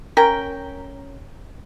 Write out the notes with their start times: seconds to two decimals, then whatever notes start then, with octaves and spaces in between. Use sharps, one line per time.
0.17 C#4 A#4 G5